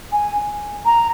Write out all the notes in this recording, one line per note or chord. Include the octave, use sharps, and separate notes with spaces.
G#5
A#5